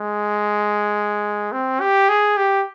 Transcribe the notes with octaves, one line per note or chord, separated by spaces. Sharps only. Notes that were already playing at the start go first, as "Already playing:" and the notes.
Already playing: G#3
C4
G4
G#4
G4